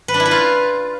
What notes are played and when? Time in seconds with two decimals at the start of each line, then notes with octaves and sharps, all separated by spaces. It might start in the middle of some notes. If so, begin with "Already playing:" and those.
0.08 B4
0.14 D4
0.20 E4
0.26 B4
0.31 F4